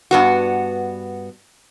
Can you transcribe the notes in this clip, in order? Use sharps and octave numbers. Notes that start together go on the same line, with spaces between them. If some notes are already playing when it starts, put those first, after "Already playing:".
G2 B3 F#4